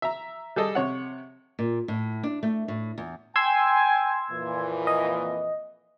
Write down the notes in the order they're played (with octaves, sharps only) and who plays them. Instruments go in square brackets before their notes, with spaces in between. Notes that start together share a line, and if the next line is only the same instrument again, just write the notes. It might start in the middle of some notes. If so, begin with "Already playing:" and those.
[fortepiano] E5 A#5
G3 G#4 A4 D#5
C3 C#5 F#5
[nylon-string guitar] A#2
A2
D4
A3
A2
E2
[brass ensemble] G5 G#5 [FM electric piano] C6 E6 G#6
[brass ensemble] F2 A#2 E3
[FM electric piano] D#5